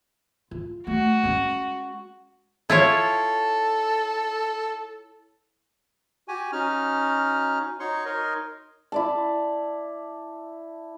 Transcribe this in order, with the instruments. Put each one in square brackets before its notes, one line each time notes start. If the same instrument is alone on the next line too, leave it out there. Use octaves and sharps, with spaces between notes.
[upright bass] F4
[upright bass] A3 [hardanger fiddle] F#4
[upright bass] G#3 C#4
[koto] E4 F4 C#5 [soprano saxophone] A4
[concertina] F#4 G4 G#5
C#4 D#4 F#4 F6
D#4 F#4 C#5 C6 C#6
D#4 A#4 C#5 D#5 C6
[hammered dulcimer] E4 D5 A5